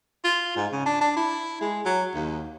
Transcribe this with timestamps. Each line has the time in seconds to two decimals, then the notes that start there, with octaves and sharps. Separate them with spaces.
0.24 F4
0.56 G#2
0.72 C#3
0.86 D4
1.01 D4
1.17 E4
1.61 G#3
1.86 F#3
2.14 D#2